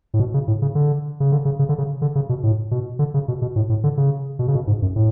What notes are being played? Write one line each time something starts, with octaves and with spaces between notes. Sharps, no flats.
A2
B2
C#3
A2
C#3
D3
C#3
D3
C#3
C#3
D3
C#3
D3
C#3
B2
A2
B2
D3
C#3
B2
B2
A2
A2
D3
C#3
B2
C#3
B2
G#2
F#2
A2